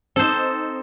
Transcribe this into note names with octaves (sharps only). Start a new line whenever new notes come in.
C4 D#4 A4 C5